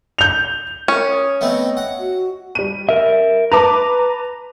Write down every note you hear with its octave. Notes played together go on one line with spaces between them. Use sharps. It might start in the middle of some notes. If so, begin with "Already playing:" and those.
G6 F7
C#4 A#4
D#6
A3 B3 C4 D#5
F#5
F#4
G3 D#7
A#4 E5
B4 A5 A#5 D6